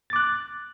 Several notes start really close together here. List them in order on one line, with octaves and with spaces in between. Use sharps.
A6 D6 F#6